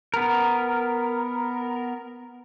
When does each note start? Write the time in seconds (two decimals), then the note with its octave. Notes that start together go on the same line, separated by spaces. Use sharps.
0.14 B3 A#4